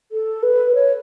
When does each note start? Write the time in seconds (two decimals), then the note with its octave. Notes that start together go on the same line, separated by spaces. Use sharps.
0.12 A4
0.43 B4
0.75 C#5